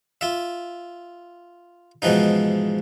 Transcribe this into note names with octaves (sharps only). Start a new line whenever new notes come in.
F4 E5
G#2 B2 E3 F3 D#4